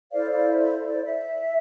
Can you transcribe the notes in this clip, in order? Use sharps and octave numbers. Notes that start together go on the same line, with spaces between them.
E4 A4 C5 D5 F5
D5 F5
E5
D5
E5